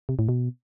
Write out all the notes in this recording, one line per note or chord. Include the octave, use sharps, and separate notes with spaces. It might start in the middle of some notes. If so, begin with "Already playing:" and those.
C3
A2
B2